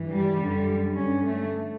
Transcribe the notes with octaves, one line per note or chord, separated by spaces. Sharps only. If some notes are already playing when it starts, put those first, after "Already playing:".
Already playing: G2 E3
G3
F#2 D3
G2 D3 C#4
A3